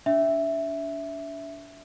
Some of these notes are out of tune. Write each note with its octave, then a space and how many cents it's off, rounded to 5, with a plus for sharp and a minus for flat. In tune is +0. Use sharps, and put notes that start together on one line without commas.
D4 -35 E5 +0